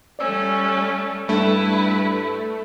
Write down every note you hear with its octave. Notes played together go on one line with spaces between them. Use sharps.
G3 A3 C#4 D5 E6
G2 A3 E4 B4